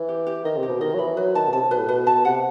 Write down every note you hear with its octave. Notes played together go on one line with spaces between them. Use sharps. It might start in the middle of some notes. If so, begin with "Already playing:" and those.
Already playing: E3
G4
G4
D#3 D#5
C3
G4
B2
D#3 D#5
F#3
E3 B5
F#3 B4
D#3 A5
B2
C3 A5
B2 B4
A2
B2 B4
B2 A5
C3 F#5